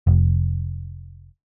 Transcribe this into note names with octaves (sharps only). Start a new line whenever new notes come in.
F1